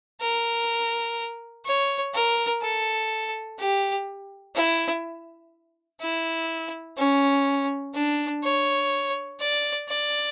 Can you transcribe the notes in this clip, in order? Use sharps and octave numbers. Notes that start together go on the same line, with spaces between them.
A#4
C#5
A#4
A4
G4
E4
E4
C#4
D4
C#5
D5
D5